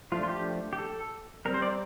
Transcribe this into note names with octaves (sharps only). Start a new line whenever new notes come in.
F3 A3 D4 F4
F4
G4
G4
A4
G3 C4 A#4
C5
D5